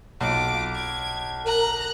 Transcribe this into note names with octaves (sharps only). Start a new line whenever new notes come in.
B1 F4 D6
G#6
A#4 A#5 F#6